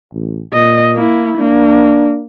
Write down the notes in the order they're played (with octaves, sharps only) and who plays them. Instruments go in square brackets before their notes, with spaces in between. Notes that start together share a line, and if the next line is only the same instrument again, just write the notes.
[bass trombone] A1
[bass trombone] A#2 [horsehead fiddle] D#5
[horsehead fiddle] A#3 E4
[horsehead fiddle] A#3 [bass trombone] D4